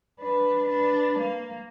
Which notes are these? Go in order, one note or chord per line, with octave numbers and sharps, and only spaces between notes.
D4 B4
D4 B4
A#3